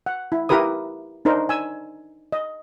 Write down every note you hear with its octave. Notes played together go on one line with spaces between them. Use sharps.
F#5
E4
E4 G4 A#4 B4 D#6
D4 D#4 A#4 C5
G#5 E6
D#5